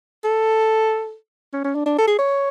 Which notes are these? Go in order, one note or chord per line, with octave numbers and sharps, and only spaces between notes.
A4
C#4
C#4
D4
D4
A4
G#4
C#5